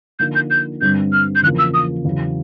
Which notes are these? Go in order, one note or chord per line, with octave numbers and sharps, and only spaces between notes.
D3 F3 A#3 D#4 G6
G6
G6
G2 D3 G3 C4 G6
F6
G6
E2 C#3 F3 A#3 F#6
E6
D#6
E2 C#3 F#3